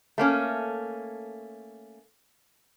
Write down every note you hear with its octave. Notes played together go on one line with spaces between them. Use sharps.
A3 A#3 C#4